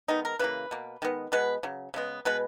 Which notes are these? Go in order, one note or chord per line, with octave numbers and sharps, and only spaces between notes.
D#3 G#3 B3 D#4
A#4
C#3 E3 A#3 B4
B2 A#3
D#3 G#3 B3
B2 G#3 B3 B4
C#3 F#3
C#3 G#3 B3
B2 G#3 B3 B4